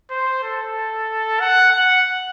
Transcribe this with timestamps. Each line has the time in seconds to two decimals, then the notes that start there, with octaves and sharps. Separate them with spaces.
0.10 C5
0.43 A4
1.40 F#5
1.72 F#5